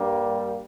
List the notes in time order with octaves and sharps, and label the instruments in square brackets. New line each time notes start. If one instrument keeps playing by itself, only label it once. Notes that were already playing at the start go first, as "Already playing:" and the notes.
Already playing: [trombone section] G2 G3 A#3